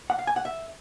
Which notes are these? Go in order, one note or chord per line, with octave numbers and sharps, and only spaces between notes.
F#5
F5
G#5
F#5
E5